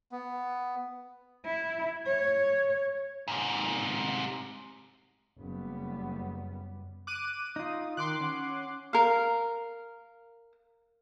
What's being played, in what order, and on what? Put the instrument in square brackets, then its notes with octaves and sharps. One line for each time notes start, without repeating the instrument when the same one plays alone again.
[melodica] B3
[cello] E4
C#5
[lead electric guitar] G#2 C3
[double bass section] F#1 G3 B3
[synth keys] D6 F#6 D#7
[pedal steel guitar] D#4 F4 [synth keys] D#6
[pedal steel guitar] D#3 [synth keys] C6 D6 F#6
[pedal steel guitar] C#4 F#5
[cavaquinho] A#4 F5